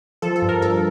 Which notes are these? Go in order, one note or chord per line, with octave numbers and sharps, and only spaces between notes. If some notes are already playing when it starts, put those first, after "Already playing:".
F3 A4
A4
G2
A#4
G2 A4